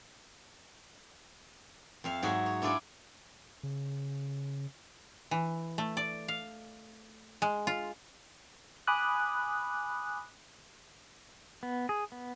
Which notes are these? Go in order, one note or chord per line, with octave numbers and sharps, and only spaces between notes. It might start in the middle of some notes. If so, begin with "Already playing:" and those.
F2 E5 F5
G#2 F#3 F#4 G#4 E5 F#5
C#5
D4 E4 F4 G#4 A4 D5
C#3
E3
A3
D5
F5
G#3
F4
G#5 B5 D6 D#6 F#6
B3
G#4
B3